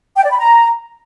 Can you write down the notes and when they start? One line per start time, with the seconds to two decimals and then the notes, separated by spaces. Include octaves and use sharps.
0.17 G5
0.24 D5
0.31 B5
0.38 A#5